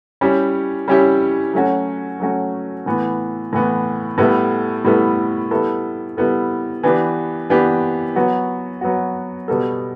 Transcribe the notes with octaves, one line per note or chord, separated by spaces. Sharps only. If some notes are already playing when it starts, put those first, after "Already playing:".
G3 C#4 E4 G4
G3 C#4 E4 G4
F#3 A3 C#4 F#4
F#3 A3 C#4 F#4
A2 E3 B3
A2 E3 B3
A2 G3 B3 E4 A4
A2 G3 B3 E4 A4
G3 B3 E4 A4
G3 B3 E4 A4
E3 B3 D4 G4
E3 B3 D4 G4
F#3 B3 F#4
F#3 B3 F#4
B2 G3 B3 F#4 A4